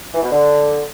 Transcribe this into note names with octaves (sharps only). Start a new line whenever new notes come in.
E3
B2
D3